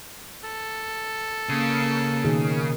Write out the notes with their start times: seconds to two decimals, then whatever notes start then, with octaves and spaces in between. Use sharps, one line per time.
0.44 A4
1.49 C#3 A#3
2.24 B2 D#3 G#4